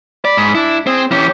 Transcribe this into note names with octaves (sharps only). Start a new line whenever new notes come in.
D5 B5
G#2
D4 E4
C4 G#4
E3 C#4 G4